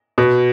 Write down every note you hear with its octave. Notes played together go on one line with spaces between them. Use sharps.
B2